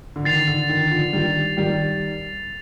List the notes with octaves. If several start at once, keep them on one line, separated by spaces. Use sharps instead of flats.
D3
D#3 A6 C7 F7
D3
D#3
D3 F3
D#3 G3
D#3 G3